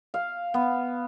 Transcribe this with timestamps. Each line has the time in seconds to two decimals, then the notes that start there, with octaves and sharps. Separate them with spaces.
0.14 F5
0.54 B3